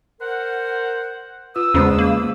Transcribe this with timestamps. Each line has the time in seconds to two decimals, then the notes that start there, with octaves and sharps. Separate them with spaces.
0.20 A#4 C5 F#5
1.56 F4 B4 D#6 E6
1.74 E2 C#3 G#3 C#4 C5 B5
1.99 A#3